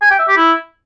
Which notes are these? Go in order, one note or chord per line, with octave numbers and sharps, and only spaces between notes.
G#5
G5
E5
G4
E4